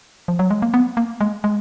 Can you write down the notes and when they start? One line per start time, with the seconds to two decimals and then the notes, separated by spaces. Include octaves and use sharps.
0.28 F3
0.39 F#3
0.51 G#3
0.62 A#3
0.74 B3
0.97 A#3
1.21 G#3
1.44 G#3